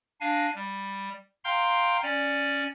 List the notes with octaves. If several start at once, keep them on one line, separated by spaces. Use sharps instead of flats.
D4 F5 G#5 A#6
G3
F5 G5 A#5 C6 F6 G6
C#4 D5 G#5